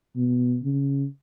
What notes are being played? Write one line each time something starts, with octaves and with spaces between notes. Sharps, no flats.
B2
C#3